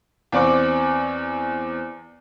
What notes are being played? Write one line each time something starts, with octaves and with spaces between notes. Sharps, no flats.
E2 C4 D5 C#6 D6